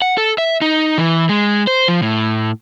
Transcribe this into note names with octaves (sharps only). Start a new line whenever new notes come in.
F#5
A4
E5
D#4
E3
G#3
C5
F3
A2